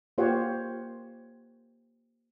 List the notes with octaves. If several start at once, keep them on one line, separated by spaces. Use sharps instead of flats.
A#3 F4 G4 C5 C#5 F#5